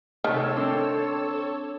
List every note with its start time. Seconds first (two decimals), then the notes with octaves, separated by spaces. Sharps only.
0.24 C3 D#3 A3 A4 C#5 E6
0.57 C4 D4